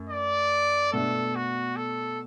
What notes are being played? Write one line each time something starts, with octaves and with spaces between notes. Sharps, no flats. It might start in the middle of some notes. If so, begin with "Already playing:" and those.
Already playing: F#2 A3
D5
B2 A3 D4 A4
F#4
A4